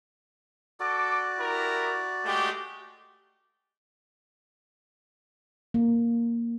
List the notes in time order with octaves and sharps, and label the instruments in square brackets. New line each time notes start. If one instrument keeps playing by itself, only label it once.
[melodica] F#4 D5 [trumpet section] A4 D6
[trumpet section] E4 G4 A#4
G#3 A3 G4
[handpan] A#3